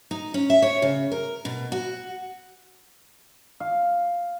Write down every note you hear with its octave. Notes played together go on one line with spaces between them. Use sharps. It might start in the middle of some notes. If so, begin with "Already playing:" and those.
D#4
C#4
E5
C#5
C#3
A#4
B2
F#4
F5